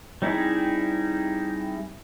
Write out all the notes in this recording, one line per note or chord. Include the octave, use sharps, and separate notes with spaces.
G3 C4 D#4 E4 G#4